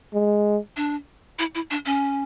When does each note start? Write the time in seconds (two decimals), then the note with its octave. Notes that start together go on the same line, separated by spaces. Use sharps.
0.14 G#3
0.77 D4
1.39 E4
1.55 E4
1.71 D4
1.86 C#4